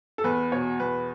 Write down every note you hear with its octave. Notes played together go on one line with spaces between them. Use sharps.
A4
E2 B4
B2 C#5
E2 B4